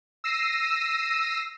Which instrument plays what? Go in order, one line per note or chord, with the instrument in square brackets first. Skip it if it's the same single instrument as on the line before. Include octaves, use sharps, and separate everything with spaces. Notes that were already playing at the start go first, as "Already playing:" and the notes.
[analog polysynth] E6 A#6 C7 D#7